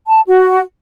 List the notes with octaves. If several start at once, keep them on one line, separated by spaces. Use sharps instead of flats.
A5
F#4